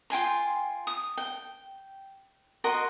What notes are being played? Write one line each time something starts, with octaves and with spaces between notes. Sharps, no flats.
F4 G5 G#5 C6
D#6
G5
F#4 A#4 D#5 C6